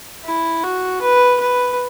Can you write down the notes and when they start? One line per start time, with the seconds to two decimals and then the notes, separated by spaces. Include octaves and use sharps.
0.25 E4
0.63 F#4
1.02 B4
1.40 B4